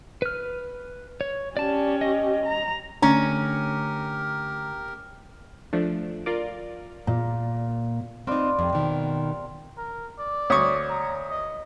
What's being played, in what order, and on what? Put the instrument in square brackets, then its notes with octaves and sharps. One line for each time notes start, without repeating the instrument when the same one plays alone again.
[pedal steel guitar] B4 F6
C#5
[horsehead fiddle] C#4 G4 [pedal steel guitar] D5 A5
[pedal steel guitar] D#5
[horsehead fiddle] A#5
[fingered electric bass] D3 A3 D4 [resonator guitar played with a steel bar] C#4 [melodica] G4 A#4 [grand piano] A#5
[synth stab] F3 A3 D4
F4 A#4 D5
[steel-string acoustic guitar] A#2
[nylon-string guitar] C4 D#4 [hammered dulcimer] F4 B4 D5
[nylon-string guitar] F2 [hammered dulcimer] C3
[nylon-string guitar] B2 D#3
[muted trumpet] A#4
D5
[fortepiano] D2 C#6 [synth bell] C#5 D#6
[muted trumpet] A#5
D#5